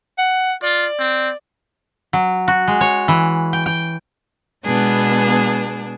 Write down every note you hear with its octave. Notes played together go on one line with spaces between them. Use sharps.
F#5
F4 D5
C4
F#3
F#4
G#3
C#5
E3
G5
G5
B2 G#3 B3 D4 G#4